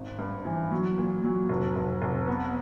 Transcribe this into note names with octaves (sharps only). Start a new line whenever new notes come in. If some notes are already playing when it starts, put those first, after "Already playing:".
Already playing: G#1
G2
E3
F#3
A#2
F#3
F1
F1
F1
B3